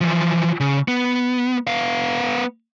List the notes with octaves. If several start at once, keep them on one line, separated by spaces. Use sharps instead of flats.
E3 F3
C#3
B3
B3 F5